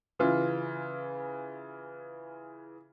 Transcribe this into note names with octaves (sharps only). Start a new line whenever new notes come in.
C#3 E3 F4